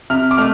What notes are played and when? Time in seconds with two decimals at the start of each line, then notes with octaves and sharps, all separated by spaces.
0.10 C3 F6
0.31 D6
0.37 A3 F6